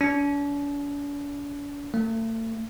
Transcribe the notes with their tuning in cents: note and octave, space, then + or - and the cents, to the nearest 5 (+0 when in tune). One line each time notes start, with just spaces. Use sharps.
D4 -45
A3 +40